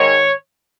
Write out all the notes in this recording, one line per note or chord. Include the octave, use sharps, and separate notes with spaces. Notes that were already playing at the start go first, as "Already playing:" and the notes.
Already playing: G#2 D#3 C#5